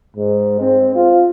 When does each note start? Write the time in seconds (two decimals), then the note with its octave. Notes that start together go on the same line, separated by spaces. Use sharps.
0.17 G#2
0.61 C4
0.95 F4